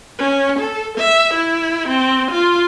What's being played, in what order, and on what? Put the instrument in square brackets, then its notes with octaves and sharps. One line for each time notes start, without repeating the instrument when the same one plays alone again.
[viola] C#4
A4
E5
E4
C4
F4